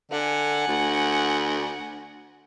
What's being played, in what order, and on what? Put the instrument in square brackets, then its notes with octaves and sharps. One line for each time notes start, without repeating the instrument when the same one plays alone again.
[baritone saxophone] D3 [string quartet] F#5 G#5
[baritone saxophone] D2